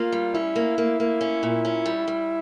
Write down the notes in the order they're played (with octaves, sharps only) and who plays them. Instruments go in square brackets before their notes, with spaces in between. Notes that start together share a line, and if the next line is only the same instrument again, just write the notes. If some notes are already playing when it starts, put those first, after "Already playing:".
Already playing: [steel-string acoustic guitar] A#3 [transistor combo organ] F4
[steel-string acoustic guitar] G3
[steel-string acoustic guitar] C#4 [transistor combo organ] E4
[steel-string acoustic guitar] A#3
A#3
A#3
C#4
A#2
C#4
G3
G3